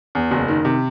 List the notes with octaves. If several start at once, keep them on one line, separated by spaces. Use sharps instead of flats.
E2
F#1
D#3
C3